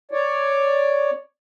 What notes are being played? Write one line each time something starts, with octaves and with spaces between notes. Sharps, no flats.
C#5 D5